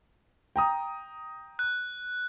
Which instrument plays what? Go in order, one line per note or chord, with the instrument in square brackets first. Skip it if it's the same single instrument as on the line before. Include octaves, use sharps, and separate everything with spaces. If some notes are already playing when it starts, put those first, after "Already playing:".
[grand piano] G5 A#5 D#6
[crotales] F#6